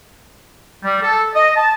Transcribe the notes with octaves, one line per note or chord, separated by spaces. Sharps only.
G3
A4
D#5
A5